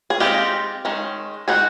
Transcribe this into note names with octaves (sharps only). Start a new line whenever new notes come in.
G#4
G#3 C4 D#4 F4 G4
D#3 G#3 C#4
G#3 C4 D#4 F#4 G#4